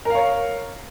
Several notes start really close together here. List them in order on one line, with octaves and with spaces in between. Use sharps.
A#4 F5 C#5